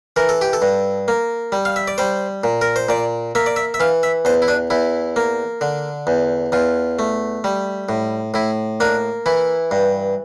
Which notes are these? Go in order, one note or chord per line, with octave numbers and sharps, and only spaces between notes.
E3 A#4
A4
G4
A4
G2
A#3
G3
F5
E5
D5
G3 C5
A#2
A#4
C5
A#2 D5
A#3 E5
D5
E5
E5
E3 F5
E5
E2 C5
E4
D4
E2 E4
A#3
D3
E2
E2 F4
A3
G3
A2
A2 E4
A#3 D4
E3 E4
G2